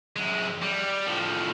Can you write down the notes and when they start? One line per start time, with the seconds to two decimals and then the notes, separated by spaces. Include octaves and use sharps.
0.16 F#2 G#3
0.62 G3
1.07 A2 F3